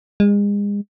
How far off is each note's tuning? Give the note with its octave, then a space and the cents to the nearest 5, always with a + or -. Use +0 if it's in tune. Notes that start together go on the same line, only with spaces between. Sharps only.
G#3 -35